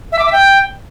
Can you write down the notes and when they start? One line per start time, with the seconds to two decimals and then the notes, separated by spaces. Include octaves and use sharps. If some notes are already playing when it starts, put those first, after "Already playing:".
0.12 E5
0.19 D6
0.26 E5
0.32 G5